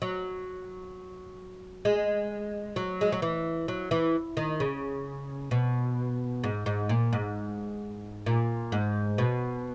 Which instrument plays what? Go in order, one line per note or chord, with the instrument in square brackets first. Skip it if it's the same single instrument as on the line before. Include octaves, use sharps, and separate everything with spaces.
[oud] F#3
G#3
F#3
G#3
F#3
E3
F#3
E3
D#3
C#3
B2
G#2
G#2
A#2
G#2
A#2
G#2
B2